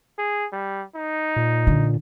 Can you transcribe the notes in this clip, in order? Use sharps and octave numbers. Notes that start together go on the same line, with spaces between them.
G#4
G3
D#4
A#2
D3